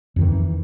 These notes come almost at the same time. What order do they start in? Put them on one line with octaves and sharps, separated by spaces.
F2 D#3 E3